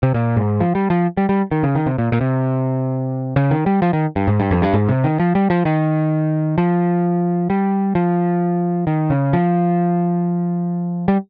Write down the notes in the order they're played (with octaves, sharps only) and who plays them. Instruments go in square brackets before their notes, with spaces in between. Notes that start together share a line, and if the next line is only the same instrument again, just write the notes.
[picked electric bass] C3
A#2
G#2
F3
G3
F3
G3
G3
D#3
C#3
D#3
C3
A#2
A#2
C3
C#3
D#3
G3
F3
D#3
G2
G#2
G2
F2
G2
G#2
C3
D#3
F3
G3
F3
D#3
F3
G3
F3
D#3
C#3
F3
G3